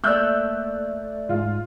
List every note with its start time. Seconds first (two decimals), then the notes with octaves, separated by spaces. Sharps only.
0.04 A3 A#3 D5 E6 F#6 G6
1.29 G#2 F4